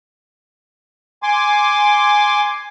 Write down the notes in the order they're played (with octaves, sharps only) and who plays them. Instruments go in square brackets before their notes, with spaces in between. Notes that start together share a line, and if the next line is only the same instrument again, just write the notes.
[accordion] G#5 C6 D6